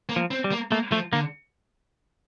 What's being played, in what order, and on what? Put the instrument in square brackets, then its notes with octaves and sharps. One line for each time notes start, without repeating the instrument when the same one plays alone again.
[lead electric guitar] A#3
[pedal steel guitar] F3
[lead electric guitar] C4
[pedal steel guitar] G3
[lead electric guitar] A#3
[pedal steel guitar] A3 [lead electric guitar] A#3
[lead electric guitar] F3 [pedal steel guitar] A3
[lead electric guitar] D3 [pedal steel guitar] A#3